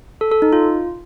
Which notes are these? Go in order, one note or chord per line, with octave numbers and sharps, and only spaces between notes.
A4
A4
D#4
F4